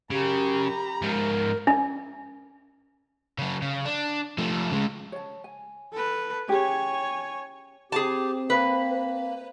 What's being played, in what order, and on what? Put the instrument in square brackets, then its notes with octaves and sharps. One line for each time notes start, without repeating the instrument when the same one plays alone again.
[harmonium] F#2 [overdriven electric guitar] C#3 [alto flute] G4 [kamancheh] A#5 B5
[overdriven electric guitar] G#2 F3 [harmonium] A#4
[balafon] C#4
[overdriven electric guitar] C#3 F#3
C#3
D4
F3 A3
C#3 G#3
[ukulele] C#5 A5
G#5
[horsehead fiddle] A4 B4
[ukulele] C#4 G4 G#4 [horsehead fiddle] C#5 G#5
[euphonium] C4 [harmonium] G4 [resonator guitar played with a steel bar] G#4 A5
[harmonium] A#3 [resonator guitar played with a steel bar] B4